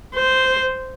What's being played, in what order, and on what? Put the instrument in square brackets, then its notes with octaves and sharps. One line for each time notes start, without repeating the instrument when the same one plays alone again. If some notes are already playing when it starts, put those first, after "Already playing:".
[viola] C5